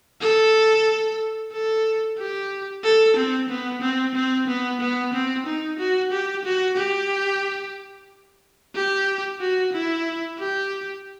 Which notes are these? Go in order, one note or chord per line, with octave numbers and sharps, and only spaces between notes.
A4
A4
G4
A4
C4
B3
C4
C4
B3
B3
C4
D#4
F#4
G4
F#4
G4
G4
F#4
E4
G4